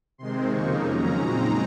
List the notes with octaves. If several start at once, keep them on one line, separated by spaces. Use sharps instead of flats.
C3 D#3 G#3 C4 C6
F2 C#3 F3 A#3 D#4 C#6
C#3 F#3 C#4 A#5
A#2 G#3 C4 D#4 A#5